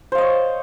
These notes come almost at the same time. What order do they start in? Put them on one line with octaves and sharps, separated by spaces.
C5 F5 D#5 C#5